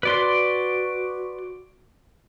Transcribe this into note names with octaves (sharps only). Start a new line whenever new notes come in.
F#4 B4 D5 C6